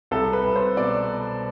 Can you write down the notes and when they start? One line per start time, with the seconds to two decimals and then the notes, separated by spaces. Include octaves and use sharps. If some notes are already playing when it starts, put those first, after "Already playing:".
0.11 C2 A4
0.33 B4
0.44 C2
0.56 C5
0.77 B2 D5